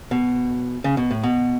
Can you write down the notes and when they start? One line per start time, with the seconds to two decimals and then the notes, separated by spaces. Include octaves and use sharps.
0.11 B2
0.84 C#3
0.97 B2
1.11 A2
1.23 B2